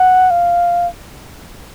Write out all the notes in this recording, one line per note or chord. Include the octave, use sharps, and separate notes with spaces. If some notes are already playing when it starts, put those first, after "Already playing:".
Already playing: F#5
F5